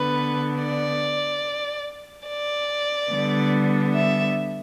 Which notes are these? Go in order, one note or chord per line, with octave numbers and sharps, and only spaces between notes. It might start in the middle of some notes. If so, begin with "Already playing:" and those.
Already playing: D3 B3 B4
D5
D5
D3 G3 B3
E5